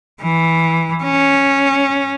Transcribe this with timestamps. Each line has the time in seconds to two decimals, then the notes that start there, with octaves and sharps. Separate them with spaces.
0.23 E3
1.04 C#4